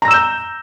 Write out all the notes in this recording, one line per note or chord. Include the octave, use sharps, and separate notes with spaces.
A#5 E6 G6 A#6 E7